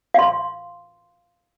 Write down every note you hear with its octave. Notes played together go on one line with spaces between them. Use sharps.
F5 C6